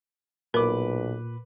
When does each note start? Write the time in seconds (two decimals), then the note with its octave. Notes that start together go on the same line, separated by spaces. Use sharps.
0.54 B1 A#2 A#4 B4 D6